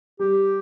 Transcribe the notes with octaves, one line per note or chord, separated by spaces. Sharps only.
G3 G4